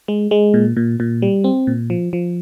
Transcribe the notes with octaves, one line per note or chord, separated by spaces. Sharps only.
G#3
G#3
A#2
A#2
A#2
G3
C4
A#2
F3
F3